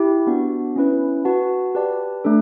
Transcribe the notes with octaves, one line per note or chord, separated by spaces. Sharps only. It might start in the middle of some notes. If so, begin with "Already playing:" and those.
Already playing: E4 G4
B3 D4 F#4
C#4 E4 B4
F#4 B4 F#5 A5
G4 B4 D5 A5
A3 D4 A4